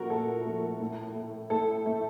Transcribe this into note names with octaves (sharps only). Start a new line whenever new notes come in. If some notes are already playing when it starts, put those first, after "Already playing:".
Already playing: A#2 F3 A3 F#4 A#4
A#2 A4
F3 A3
A2
A3
A2 A4
A3